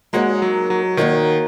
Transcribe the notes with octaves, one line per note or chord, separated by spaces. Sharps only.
G#3 A#3 D#4 F#4 A#4 C#5
F#3
F#3
D#3 A#3 D#4 F#4 A#4 C#5